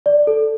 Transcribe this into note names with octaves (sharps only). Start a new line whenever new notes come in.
D5
A4